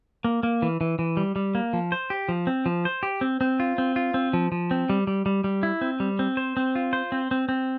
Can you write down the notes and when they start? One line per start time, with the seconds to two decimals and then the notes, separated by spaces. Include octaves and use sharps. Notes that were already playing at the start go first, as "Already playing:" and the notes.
0.24 A#3
0.43 A#3
0.62 E3
0.81 E3
0.99 E3
1.17 G3
1.36 G3
1.55 A#3
1.73 F3
1.92 C5
2.10 G4
2.29 F3
2.47 C4
2.66 F3
2.85 C5
3.03 G4
3.21 C4
3.41 C4
3.60 F4
3.78 C4
3.96 F4
4.14 C4
4.33 F3
4.52 F3
4.71 C4
4.89 G3
5.07 G3
5.26 G3
5.44 G3
5.63 E4
5.81 C4
6.00 G3
6.19 C4
6.37 C5
6.57 C4
6.75 F4
6.93 C5
7.12 C4
7.31 C4
7.49 C4